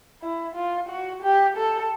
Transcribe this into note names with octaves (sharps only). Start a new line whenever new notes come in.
E4
F4
F#4
G4
A4